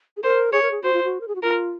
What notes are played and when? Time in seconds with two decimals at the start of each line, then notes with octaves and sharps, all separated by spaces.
0.17 G#4
0.23 A#4 C5
0.53 G#4 C#5
0.62 A#4
0.71 G#4
0.83 F#4 C5
0.93 F4
1.04 F#4
1.21 A#4
1.28 G#4
1.35 F#4
1.43 F4 A#4